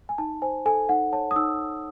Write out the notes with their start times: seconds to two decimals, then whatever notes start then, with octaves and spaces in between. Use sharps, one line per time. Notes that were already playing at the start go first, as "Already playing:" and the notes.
0.09 G#5
0.18 D#4 A5
0.42 C5 G#5
0.66 A4 G#5
0.89 D#4 F#5
1.13 C#5 A5
1.31 D#6
1.36 D#4 E6